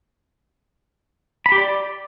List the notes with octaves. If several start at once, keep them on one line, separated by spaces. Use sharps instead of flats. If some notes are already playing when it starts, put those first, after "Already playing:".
B5
G4
D5